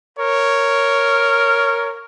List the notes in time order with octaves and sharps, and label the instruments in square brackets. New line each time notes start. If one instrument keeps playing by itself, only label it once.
[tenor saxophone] A#4 [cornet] C#5